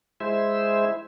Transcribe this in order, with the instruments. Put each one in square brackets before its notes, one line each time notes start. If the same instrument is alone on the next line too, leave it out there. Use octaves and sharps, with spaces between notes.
[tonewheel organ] G#3 E4 C5 E5